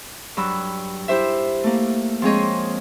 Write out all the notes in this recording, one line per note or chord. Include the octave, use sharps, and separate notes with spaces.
G2 F#3 B5 E6
E4 G4 C5 E5
A3 A#3
F3 G#3 C4 G#4 C#5 D#5